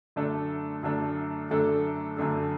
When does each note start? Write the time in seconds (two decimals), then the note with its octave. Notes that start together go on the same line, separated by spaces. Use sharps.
0.16 F#2 D3 A3 D4 A4
0.83 F#2 D3 A3 D4 A4
1.50 F#2 D3 A3 D4 A4
2.17 F#2 D3 A3 D4 A4